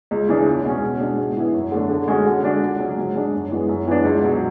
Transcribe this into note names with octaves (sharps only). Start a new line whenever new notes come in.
C#2
C#3 E3 G#3 D4
E2
B2 G#3 C#4
B2
G#3 D4
G#2
E3 B3 E4
F#2
D3 A3 D4
D3
G#3 C#4 F#4
D3
G#3 D4 F#4
C#2
C#3 F#3 C#4
G#2
G#3 D4
F#2
E3 G#3 B3
F#2
E3 B3 D4
C#2
B2 F#3